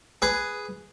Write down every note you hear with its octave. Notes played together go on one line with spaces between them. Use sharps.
G#4 B4